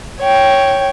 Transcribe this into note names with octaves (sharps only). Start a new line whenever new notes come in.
C#5 G5